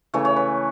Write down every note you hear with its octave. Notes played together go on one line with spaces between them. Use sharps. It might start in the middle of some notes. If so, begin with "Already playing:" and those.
C#3 E3 A3 C#5
C#5
B4